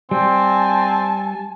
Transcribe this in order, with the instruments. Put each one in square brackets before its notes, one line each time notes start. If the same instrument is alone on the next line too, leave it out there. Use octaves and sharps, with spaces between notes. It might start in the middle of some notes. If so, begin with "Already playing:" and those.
[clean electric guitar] G3 [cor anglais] C4 [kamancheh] G#5 A5